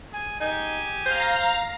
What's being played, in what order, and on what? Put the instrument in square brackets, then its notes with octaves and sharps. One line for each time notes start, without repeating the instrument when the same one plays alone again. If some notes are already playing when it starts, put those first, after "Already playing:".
[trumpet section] G#4 G#5
[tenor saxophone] D#4 [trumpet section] G4 G#4 G#5
[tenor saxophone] C5 [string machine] F5 A#5